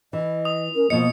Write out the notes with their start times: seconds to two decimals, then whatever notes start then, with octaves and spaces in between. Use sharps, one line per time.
0.13 E3 D#5
0.45 D#6
0.75 C#4 A#4
0.90 B2 F3 A#3 D#5 C#7